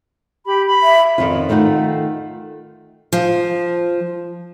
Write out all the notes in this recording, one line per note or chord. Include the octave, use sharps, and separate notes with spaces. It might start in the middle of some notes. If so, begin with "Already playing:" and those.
G4 B5
B5
E5
F2 D#3 C#4 F4
D#3 A3 D#4 F4 F#5
F3